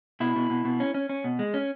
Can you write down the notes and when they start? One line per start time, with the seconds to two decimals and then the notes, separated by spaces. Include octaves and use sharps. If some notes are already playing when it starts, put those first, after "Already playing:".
0.20 B2 E4
0.36 B2
0.50 B2
0.65 B2
0.80 C#4
0.94 C#4
1.09 C#4
1.24 B2
1.39 G#3
1.54 C#4